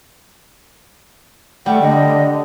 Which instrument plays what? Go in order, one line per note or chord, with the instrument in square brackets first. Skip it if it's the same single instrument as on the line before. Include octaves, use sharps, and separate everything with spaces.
[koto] G3 [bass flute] A3 [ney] F#5
[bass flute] D3 [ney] D#5